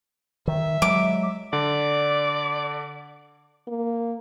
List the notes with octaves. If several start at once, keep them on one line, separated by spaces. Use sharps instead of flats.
D#3 E5
F#3 G#3 D6
D3 D5
A#3